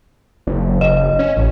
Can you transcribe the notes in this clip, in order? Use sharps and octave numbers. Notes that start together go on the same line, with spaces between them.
F#1
F#1 D#5
C#4
A1